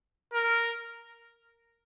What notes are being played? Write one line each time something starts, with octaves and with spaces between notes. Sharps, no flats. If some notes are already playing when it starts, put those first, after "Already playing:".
A#4